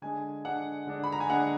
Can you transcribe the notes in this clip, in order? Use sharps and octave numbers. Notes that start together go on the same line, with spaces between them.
D3 G#3 D4 G#5
D3 G#3 D4 F#5
D3 G#3 D4
B5
A#5
G#5
D3 G#3 D4 F#5